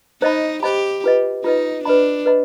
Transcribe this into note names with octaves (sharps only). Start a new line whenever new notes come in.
D#4 C5 D#5 B5
G4 C5 D#5 B5
F4 B4 D#5
D#4 F4 B4 D#5
D4 B4 D#5 B5
B4 D#5 B5